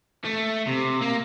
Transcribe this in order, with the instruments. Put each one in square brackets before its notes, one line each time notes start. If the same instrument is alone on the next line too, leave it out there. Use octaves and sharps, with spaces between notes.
[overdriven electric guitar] A3
C3
A#3